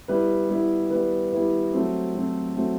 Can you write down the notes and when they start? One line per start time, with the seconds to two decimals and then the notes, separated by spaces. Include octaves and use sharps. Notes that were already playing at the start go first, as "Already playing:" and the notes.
0.08 G3 B3 E4 B4
0.50 G3 B3 E4 B4
0.90 G3 B3 E4 B4
1.32 G3 B3 E4 B4
1.73 F#3 A3 C4
2.14 F#3 A3 C4
2.56 F#3 A3 C4